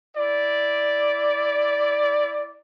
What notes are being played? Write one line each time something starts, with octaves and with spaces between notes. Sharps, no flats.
E4 D5